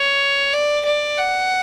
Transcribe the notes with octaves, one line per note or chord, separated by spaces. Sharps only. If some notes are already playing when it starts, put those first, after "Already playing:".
Already playing: C#5
D5
D5
F#5